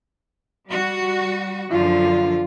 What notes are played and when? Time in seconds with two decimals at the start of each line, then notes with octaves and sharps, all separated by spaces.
0.69 G3 F#4
1.71 F#2 D3 F3 F4